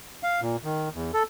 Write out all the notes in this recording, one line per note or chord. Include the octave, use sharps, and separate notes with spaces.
F5
A#2
D#3
E2
A4